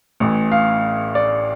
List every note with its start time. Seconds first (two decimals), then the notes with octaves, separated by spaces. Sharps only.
0.20 A1 A2 E3
0.52 F5
1.15 D5